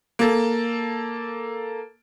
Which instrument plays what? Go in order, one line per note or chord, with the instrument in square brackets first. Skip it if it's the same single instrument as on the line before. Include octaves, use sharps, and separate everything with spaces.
[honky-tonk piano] A#3 A4